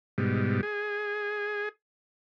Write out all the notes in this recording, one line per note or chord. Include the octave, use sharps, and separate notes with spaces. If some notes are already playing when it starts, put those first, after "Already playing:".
G#2 B2 G3
G#4